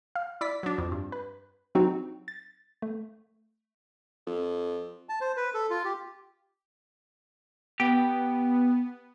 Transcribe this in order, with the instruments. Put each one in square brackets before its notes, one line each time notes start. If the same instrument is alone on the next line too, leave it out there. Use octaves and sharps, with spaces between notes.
[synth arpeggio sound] F5
E4 D5 B6
F#3 D4
F2
G2
B4
F#3 C4 D4 D#4 F#4
A6
A3
[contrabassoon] F2
[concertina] A5
C5
B4
A4
F4
G4
[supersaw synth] B3 [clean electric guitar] G4